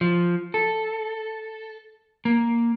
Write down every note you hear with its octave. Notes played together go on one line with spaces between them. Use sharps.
F3
A4
A#3